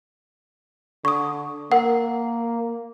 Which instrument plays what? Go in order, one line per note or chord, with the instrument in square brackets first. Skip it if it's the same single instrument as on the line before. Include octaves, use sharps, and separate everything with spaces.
[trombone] D3 [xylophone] C#6 D#6
[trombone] A#3 [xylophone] A#4 F#5